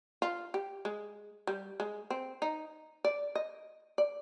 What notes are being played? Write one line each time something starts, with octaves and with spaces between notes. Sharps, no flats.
F4
G4
G#3
G3
G#3
C4
D#4
D5
D#5
D5